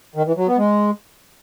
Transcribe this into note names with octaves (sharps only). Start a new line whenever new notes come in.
D#3
E3
F#3
B3
G#3